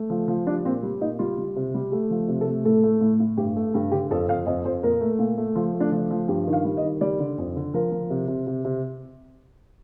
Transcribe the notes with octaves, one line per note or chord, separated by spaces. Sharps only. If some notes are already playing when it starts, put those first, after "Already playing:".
Already playing: A3
F3
F3
G3 D4
A#2 C4
G3
A#2 D#4
G3 F4
G3
C3
G3
A3 G4
F3
C3
A4
A3
A2 A4
A3
A2
A2
G2 G4
A3
G2 G4
D3 G4
F2 A4
F2 F5
F2 D#5
F2 C5
A#2 A#4
A3
A#2
A3
F3 F4
A3
D4
F3
F3
G2 G4
D#3
F5
G3
D#5
D#3
G3 D5
D3
F2
D3
F3 A#4
F3
C3
C3
C3
C3